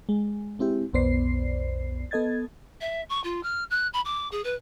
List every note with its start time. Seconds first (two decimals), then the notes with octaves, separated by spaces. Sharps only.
0.09 G#3
0.59 G#3 C4 E4 G4
0.93 B1 F2 B3 C5 D5 C7
2.11 B3 A4 D#5 G#6 A6
2.81 E5
3.09 C#6
3.24 F4
3.43 F6
3.70 F#6
3.93 B5
4.05 D6
4.32 G#4
4.44 B4